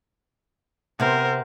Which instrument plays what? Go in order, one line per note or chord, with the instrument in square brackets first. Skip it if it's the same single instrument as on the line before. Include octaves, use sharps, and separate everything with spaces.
[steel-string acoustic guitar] C3 B3 [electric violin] A#4 C5